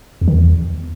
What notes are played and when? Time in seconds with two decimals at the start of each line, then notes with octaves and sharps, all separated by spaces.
0.21 E2
0.28 D#3
0.34 E2